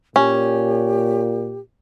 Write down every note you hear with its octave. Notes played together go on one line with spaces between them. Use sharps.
A#2 C#4 G4